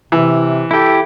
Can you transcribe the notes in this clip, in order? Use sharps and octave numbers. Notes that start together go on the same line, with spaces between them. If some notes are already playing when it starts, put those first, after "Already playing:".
C3 E3
E4 G4 A4